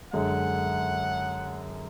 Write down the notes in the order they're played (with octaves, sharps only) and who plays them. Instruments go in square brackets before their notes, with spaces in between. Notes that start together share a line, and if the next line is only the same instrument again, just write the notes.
[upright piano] F#2 D3 G#3 [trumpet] F#5